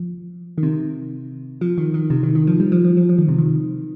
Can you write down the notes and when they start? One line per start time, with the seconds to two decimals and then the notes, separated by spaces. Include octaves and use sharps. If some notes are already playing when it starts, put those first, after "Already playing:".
Already playing: F3
0.58 D#3
0.63 C3
1.61 F3
1.78 D#3
1.94 D#3
2.10 C3
2.23 D#3
2.35 D#3
2.47 F3
2.60 G3
2.72 F3
2.84 F3
2.97 F3
3.09 F3
3.19 D#3
3.29 C3
3.38 D#3